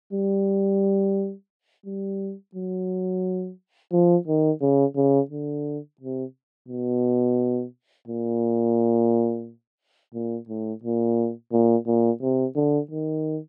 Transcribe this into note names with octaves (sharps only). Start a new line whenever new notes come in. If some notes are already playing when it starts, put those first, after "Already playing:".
G3
G3
F#3
F3
D#3
C#3
C#3
D3
C3
B2
A#2
A#2
A2
A#2
A#2
A#2
C3
D3
D#3